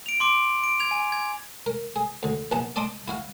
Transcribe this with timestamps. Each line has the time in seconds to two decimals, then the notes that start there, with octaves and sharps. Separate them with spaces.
0.06 D7 F7
0.20 C6 D6 D7
0.64 D7
0.80 G#6 F7
0.91 G#5
1.12 G#6
1.66 A#4
1.96 G#4
2.23 D2 D3
2.51 A#1 E3 B3 A5 A#5
2.76 D5 D#5 A5 C6 D6 D#6
3.08 E4 F#4 F5